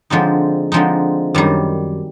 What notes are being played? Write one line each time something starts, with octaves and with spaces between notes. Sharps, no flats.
D3 F3 G#3 C4 D#4
D3 F3 G#3 C4 D#4
F#2 D#3 G3